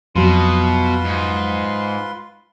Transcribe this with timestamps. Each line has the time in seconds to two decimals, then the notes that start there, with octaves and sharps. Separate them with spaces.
0.16 F2 B2 F#3 F4 B4 C6
1.05 G#2